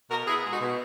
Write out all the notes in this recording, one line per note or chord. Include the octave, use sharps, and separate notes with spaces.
B2 F#4 A#4
B3 E4 G#4
G#3
D#4 F#4
B2